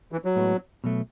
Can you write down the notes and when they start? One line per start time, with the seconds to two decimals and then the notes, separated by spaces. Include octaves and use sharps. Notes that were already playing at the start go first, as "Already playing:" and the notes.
0.12 E3
0.25 F#3
0.36 A2 G#3 B3
0.84 B2 F#3 A3